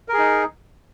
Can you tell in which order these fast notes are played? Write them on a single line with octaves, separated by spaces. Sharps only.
A#4 G#4 D#4